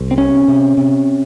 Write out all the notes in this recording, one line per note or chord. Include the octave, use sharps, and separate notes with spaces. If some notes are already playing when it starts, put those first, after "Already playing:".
Already playing: C2
C4
C3 C#4
C3
C3